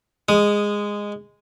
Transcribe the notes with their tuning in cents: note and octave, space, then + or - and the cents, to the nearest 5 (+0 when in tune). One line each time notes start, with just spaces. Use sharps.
G#3 -10 D#6 +0